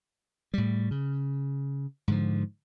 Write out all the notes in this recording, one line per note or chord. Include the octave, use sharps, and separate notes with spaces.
A2 G3
C#3
G#2 D3 F3